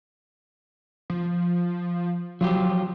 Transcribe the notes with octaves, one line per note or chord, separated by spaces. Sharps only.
F3
F3 F#3 F4 G4